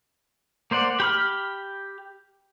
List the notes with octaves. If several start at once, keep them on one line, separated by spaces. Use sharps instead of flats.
A#3 C5 D5 F#5
G4 B5 F6